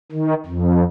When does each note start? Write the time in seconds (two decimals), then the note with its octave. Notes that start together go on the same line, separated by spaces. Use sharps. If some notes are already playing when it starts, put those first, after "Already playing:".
0.12 D#3
0.46 F2